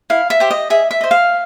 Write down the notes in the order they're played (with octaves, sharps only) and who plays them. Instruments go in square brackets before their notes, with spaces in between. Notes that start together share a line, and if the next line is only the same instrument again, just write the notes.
[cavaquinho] E4 F5
E5
G4 C5
D#5
G#4 E5
E5
C5 D#5
F5